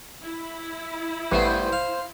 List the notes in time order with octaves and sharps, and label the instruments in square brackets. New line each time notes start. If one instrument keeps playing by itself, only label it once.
[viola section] E4
[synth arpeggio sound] A1 B4 D6 [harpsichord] G2 A3 B3 [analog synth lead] C5
[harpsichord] F5